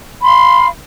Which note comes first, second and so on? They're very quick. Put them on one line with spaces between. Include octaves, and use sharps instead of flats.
B5 C6 F5